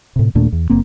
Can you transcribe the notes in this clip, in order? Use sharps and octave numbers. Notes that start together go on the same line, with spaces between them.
A2 C3
D#2 A#2 A3 D4
E2
F#1 A#3 C4